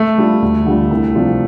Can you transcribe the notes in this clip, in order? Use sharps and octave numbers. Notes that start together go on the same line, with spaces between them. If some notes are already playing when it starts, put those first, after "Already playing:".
Already playing: A3
G3 D4 F4
D2
D3 G3 D4 F4
C2
C3 F3 D4 F4